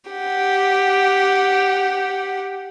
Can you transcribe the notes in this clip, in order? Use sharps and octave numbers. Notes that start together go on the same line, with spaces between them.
G4 F#5